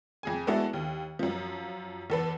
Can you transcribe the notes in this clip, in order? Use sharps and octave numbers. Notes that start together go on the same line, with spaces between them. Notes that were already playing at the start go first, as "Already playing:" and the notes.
F2 G#4 G#5
G#3 B3 D4 E4 F#4 A4
D#2
F#2 F3
E2 A4 B4